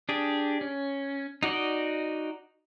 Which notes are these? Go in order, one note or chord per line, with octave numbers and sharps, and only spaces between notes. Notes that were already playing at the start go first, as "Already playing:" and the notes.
D4 G4 G#4
C#4
D#4 F#4 D5 D#5